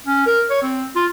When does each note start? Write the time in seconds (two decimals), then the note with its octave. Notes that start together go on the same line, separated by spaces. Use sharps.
0.07 C#4
0.26 A#4
0.50 C#5
0.62 C4
0.96 F4